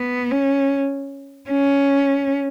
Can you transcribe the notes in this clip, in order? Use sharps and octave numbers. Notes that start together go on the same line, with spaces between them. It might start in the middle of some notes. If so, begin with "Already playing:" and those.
Already playing: B3
C#4
C#4